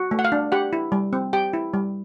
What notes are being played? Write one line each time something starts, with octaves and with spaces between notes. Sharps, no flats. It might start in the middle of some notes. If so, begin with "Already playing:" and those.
Already playing: F#4
A3
F#5
F5
D4
G4 F#5
E4
G3
C4
G4 G5
E4
G3